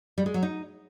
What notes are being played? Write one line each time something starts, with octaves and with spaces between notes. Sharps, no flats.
G3
G#3
F#3
D#4